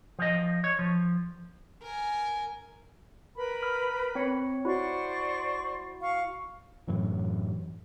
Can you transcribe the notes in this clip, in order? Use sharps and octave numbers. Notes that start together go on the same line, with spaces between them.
F3 D#5
C#5
F3
A#4 G#5
A#4 B4 B5
F6
C4 C#5 C#7
E4 F#4 C5 D5 C#6
F5 C#6
F#2 A2 E3 F#3